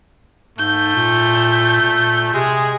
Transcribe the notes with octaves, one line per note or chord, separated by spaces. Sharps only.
G#2 A3 G6
A#2
A#2
C3 G#3 G#4